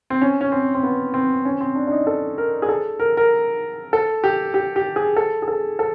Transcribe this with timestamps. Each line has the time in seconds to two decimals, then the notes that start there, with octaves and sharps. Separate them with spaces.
0.10 C4
0.21 C#4
0.41 C#4
0.52 C4
0.74 C4
0.83 B3
1.14 C4
1.45 C#4
1.61 C4
1.76 D4
1.87 D4
1.92 D#4
2.07 A4
2.38 A#4
2.62 G#4
2.69 A4
3.00 A#4
3.17 A#4
3.93 A4
4.24 G4
4.54 G4
4.76 G4
4.96 G#4
5.16 A4
5.42 G#4
5.48 A4
5.79 A4